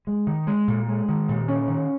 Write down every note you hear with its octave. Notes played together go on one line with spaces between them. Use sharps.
G#3
D#3
G#3
A#2
G#3
D#3
A#2
C#4
D#3